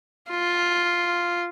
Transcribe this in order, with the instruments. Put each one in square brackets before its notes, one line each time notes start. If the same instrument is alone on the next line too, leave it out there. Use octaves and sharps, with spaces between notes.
[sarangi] F4